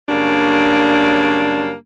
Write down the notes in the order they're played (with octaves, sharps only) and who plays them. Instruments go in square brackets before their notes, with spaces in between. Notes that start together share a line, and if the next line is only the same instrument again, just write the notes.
[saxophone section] F#2 C#3 G3 A#3 D4